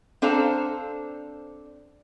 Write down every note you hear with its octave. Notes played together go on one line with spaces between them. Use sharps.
C4 D4 A4 C5 F5 A#5